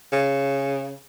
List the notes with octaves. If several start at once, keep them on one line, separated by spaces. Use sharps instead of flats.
C#3